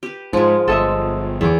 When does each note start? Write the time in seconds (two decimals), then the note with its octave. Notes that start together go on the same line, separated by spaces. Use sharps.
0.03 G4 B4
0.33 G#2 F3 G#3
0.68 G1 A4 D#5 E5
1.41 E2 D6